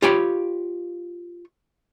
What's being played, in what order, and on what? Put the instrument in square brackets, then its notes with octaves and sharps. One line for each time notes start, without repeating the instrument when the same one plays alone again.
[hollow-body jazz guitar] F4 G4 C#5 G5 B5